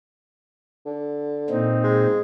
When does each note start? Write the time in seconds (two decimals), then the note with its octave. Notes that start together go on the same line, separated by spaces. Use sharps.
0.86 D3
1.50 A#2 C4 D#4
1.84 G#3